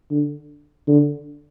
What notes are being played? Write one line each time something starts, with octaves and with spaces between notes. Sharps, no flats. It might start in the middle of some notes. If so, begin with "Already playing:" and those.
D3
D3